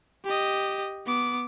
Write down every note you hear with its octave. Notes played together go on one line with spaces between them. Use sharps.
G4 D#5
B3 D6